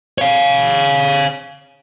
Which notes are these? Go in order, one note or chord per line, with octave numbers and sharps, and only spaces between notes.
C#5 F5